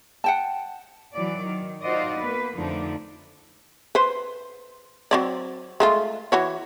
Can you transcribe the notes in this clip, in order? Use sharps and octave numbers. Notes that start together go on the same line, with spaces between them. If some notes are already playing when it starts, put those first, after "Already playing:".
F#5 G5 A5
E3 F#3 D5
D#3
D#4 F4 F#4 C5 D5 D#5
A#3 B3 B4
F2 D3 F3 A3 D4 D#4
B4 C5
F#3 C4 D5
G#3 A3 F4
E3 F#4 C#5